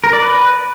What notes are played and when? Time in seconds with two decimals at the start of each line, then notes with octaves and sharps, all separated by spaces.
0.04 A#4
0.13 D5
0.23 B4